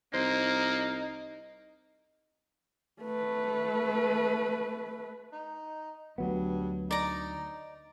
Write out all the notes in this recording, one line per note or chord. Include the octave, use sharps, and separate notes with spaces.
C2 A#3 D#4 C5
A3 B4
D#4
D2 G2 F#3 B3
D#4 D5 A#5